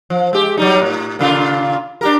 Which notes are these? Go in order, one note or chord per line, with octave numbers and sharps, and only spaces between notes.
F3
G#3 G4
F#3 G3 D#4
A2
A#2 C#3 F4
D4 G4 A#4